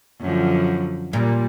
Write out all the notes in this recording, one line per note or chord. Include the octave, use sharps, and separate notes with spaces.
F#2 D3 F3
A#2 G3